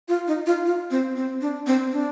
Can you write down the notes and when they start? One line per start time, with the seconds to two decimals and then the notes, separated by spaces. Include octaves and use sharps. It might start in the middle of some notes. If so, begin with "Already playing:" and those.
0.08 F4
0.27 D#4
0.46 F4
0.66 F4
0.91 C4
1.16 C4
1.41 D4
1.67 C4
1.92 D4